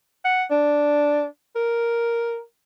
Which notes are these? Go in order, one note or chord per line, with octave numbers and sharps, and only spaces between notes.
F#5
D4
A#4